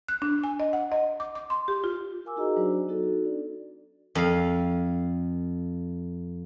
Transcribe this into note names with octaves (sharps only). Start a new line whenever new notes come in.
F#6
D4
G#5
D#5
F#5
D#5
D6
D6
C6
G4
F4
F4 A#4 F5 G#5 D6 E6
D#4 E4 F#4 G#4 D#5 A#5
F#3 D4 F#4 C5 D5
B3 D#4 F#4 A4
D4 D5
F2 F5